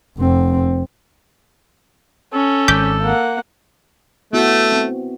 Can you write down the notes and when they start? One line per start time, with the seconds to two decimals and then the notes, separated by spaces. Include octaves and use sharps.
0.18 F1 C4
2.33 C#4 A4
2.68 G#1 D6 G6 B6
3.02 A#3 F#5
4.33 A3 B3 E4 F#4
4.72 C4